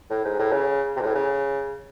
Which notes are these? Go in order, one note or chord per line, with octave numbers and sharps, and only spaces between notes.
A2
G#2
A2
C#3
C3
G#2
A2
C#3